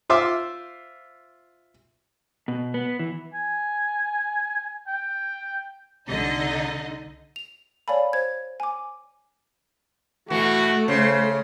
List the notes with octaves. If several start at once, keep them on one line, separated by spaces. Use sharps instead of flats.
F4 C5 E5 C6 D6 E6
B2
B3
E3
G#5
G5
C2 D3 D#4 D#5
F7
C#5 D5 F5 G#5 A5 B5
C5 G#6
G#5 D6
B2 E3 A3 F#4
C#3 C5